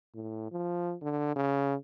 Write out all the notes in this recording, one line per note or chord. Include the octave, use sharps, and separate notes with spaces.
A2
F3
D3
C#3